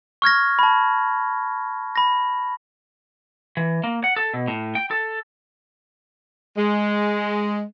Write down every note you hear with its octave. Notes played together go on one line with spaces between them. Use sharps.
C#6 F6 G#6 A#6
A5 B5
B5 A#6
E3
A#3
F#5
A4
B2
A2
G5
A4
G#3